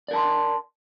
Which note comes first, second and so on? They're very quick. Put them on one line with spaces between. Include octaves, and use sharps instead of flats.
D5 A#4 A5 C6